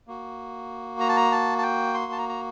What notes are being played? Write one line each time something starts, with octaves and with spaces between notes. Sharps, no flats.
A#3 F#4
A#5
A5
A#5
A5
A5
G5
C6
A5
A#5
A#5